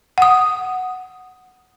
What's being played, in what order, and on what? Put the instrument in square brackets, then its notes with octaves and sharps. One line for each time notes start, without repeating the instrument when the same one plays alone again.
[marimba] F#5 D#6